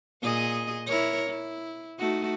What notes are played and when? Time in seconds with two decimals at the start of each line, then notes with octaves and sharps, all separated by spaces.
0.22 A#2 G#4 D#5
0.87 E4 A#4 C#5
1.30 E4
1.99 A3 D#4 F#4